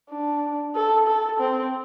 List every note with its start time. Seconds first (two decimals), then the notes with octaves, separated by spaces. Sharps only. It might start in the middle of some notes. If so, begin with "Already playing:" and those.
0.10 D4
0.75 A4
1.07 A4
1.40 C4